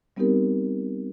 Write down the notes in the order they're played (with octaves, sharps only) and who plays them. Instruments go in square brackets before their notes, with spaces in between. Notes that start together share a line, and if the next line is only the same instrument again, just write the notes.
[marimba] G3 B3 C4 D#4 G4 A#4